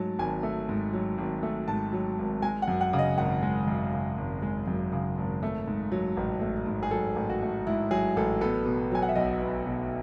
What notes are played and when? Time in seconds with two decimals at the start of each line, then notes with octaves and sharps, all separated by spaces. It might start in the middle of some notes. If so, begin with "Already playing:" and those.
Already playing: G#2 F#3 A3 A5
0.19 G#1 G#5
0.43 A3
0.69 G#2
0.93 F#3
1.18 G#1
1.43 A3
1.68 G#2 A5
1.93 F#3
2.19 G#1
2.42 G#3 G#5
2.62 F#5
2.68 F#2
2.81 F#5
2.93 C#3
2.99 D#5
3.18 G#1 F#5
3.43 G#3
3.68 F#2
3.93 C#3
4.18 G#1
4.42 G#3
4.68 F#2
4.92 C#3
5.18 G#1
5.43 A3
5.68 G#2
5.92 F#3
6.17 A1
6.41 A3
6.66 G#2
6.83 G#4
6.91 F#3 A4
7.16 A1
7.30 F#4
7.42 A3
7.67 G#2 E4
7.91 F#3 G#4
8.16 A1 A4
8.41 B3 A4
8.66 B2
8.92 F#3 G#5
9.02 F#5
9.09 E5
9.15 B1 D#5
9.41 B3
9.66 B2